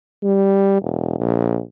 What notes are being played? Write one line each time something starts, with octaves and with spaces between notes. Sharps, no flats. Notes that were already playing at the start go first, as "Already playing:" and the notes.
G3
E1
A#1